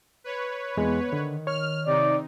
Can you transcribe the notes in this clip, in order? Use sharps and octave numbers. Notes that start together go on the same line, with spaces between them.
B4 C#5
E2 G#3 B3
D3 D#3
C#5 F6
C3 D#4 D5